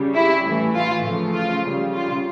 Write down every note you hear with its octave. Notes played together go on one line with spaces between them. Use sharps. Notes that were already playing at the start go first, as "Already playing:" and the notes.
Already playing: C#3 G3
E4
A2 E3 A3
F4
C#3 F3 A3
F4
C#3 G3
F4